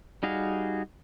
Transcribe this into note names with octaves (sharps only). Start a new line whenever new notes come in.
G3 D#4 F#4 G#4 F5